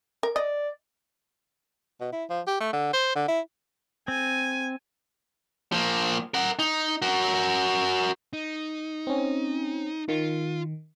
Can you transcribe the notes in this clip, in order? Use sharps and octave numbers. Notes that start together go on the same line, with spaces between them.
A#4
D5 D#5
B2
E4
F3
G4
A3
D3
C5
D3
E4
C4 G#5
F3 A#3
A#4 F#5
D#4
F#4 A#4
D#4
C4 C#4
D#3 F4